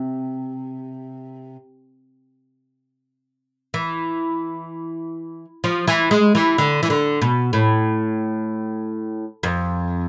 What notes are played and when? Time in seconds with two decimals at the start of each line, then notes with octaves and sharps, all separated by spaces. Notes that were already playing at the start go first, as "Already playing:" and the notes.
Already playing: C3
3.74 E3
5.64 F3
5.87 E3
6.11 G#3
6.35 E3
6.58 D3
6.83 E3
6.90 D3
7.22 B2
7.53 A2
9.43 F2